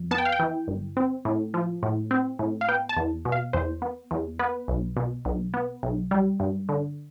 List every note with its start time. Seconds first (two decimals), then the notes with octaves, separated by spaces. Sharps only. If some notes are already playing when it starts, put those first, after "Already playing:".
Already playing: F2
0.11 B3 A5
0.18 G5
0.25 F5
0.32 G5
0.39 E3
0.68 G1
0.97 C4
1.25 A2
1.54 F3
1.83 A2
2.11 C4
2.39 A2
2.61 F5
2.69 B3 G5
2.89 A5
2.97 E2
3.25 B2
3.32 F5
3.53 E2 C5
3.82 B3
4.11 E2
4.39 B3 B4
4.68 B1
4.97 B2
5.25 B1
5.54 B3
5.83 B1
6.11 G3
6.40 G2
6.69 D3